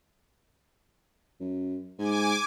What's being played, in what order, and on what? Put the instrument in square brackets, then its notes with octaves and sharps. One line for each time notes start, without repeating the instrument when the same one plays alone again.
[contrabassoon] F#2
[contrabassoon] G#2 [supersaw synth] G#5 D6